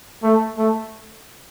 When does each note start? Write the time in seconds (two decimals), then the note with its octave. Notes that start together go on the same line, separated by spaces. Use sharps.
0.23 A3
0.58 A3